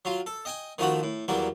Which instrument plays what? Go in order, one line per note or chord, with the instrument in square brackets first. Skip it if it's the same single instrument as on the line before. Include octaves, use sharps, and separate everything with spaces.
[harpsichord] F#3 F4
A4
D#5 G5 G#5
D#3 F3 A3 F#4 B5
A2
E2 F#3 G3 A#3